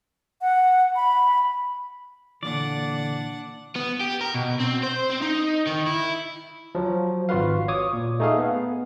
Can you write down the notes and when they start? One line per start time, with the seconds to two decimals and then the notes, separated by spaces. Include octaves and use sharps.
0.41 F#5
0.96 B5
2.43 A#2 D3 E3 D4 D5 F#5
3.76 B3
4.01 G4
4.21 A#4
4.34 B2
4.60 C4
4.83 C5
5.10 C4
5.22 D#4
5.67 D#3
5.86 E4
6.75 F3 F#3
7.29 G#1 F4 F#4 B4 F5
7.68 C#5 D6 D#6
7.93 A#2
8.20 A3 D#4 G#4 A4 F5
8.38 B3